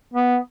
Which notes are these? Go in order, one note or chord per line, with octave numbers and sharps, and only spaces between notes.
B3